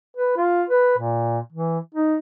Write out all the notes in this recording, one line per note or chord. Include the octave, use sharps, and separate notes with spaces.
B4
F4
B4
A#2
E3
D#4